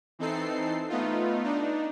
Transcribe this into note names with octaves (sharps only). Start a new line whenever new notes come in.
E3 C4 D#4 A4 C7
A3 B3 D#4 F4
D4 D#4